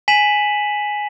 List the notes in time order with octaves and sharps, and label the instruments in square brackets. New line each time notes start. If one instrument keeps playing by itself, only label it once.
[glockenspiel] G#5 B6 D#7 E7 F#7